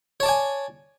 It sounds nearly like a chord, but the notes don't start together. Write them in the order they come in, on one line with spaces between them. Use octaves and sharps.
C#5 A5 D5 G#5